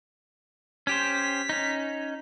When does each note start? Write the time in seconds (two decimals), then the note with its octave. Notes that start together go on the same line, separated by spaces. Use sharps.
0.87 C#4 G4 C5 B6
1.49 C#4 D#4